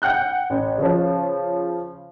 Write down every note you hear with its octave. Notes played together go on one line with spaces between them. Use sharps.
F#5 G5 F#6 G6
A1
C#3 F3